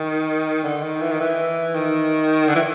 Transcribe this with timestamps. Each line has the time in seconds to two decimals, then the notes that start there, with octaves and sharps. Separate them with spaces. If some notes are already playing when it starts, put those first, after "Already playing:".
Already playing: D#3
0.64 D3
0.82 D#3
1.01 E3
1.11 D#3
1.20 E3
1.75 D#3
2.48 D3
2.55 E3